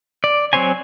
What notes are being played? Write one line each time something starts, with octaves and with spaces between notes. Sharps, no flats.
D5
F#3 C4 C5 C#5 G#5